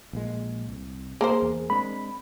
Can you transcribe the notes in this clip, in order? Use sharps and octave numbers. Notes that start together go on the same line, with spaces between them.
A#1 A#2 G#3
C2
A#3 G#4 A#4 C5
E2
G#3 C4 D4 B5